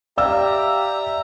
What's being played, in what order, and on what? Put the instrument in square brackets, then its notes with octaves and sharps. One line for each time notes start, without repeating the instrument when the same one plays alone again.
[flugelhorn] G4 [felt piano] D5 F5 E6 [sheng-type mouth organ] E5 A#5